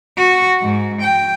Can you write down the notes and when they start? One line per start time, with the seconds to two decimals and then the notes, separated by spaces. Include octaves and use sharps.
0.17 F#4
0.62 G#2
1.01 G5